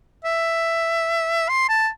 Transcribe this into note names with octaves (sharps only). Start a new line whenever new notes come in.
E5
C6
A5